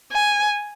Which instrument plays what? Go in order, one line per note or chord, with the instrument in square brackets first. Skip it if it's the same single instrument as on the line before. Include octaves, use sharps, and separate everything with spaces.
[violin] G#5